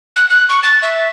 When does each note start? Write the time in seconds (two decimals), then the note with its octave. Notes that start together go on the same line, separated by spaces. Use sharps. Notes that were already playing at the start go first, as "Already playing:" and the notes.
0.16 F#6
0.30 F#6
0.49 C#6
0.63 A6
0.82 E5